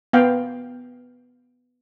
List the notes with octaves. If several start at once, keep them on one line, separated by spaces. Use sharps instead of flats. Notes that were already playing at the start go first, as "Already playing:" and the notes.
B3 F5 G5